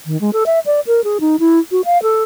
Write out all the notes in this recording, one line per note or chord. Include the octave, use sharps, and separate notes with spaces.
D#3
G#3
A4
E5
D5
A#4
G#4
D#4
E4
F#4
F5
A4